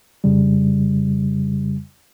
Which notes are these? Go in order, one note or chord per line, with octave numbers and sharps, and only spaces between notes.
F2 C#3 G3